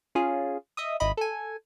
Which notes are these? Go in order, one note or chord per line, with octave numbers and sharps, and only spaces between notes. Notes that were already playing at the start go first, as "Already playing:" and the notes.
C#4 F4 G#4
D#5 E5 D#6
G#1 E4 D#5 B5
A4 G#5